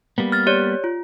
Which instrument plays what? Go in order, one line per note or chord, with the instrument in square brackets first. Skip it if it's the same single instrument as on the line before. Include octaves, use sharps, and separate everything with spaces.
[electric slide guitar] G3 A#3 B3
[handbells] F6 A6
G4 C#5 D5
F4